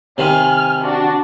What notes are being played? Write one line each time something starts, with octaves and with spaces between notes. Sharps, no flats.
C3 D#3 G#5 F6
D4 F#4